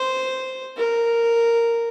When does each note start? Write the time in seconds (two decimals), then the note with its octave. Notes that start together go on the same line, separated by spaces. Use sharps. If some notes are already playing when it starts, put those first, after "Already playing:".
Already playing: C5
0.77 A#4